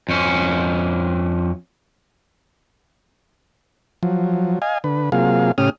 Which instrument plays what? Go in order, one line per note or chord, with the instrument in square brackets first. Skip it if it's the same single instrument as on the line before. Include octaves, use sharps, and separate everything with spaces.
[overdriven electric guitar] F2 C#4
[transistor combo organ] F3 F#3
D#5 F5 G#5
D3 B4
C3 F#3 A#3 F4 G#4 F5
A2 C#3 C#4 G4 D#6 F6